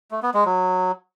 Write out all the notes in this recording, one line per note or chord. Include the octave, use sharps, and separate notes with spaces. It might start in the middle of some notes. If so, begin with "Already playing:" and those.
A3
B3
G#3
F#3